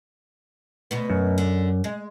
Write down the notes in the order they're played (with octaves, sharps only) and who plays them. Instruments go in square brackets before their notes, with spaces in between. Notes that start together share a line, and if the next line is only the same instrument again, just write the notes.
[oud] D2 B2 B3
[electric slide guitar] F#2
[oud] D3
G#3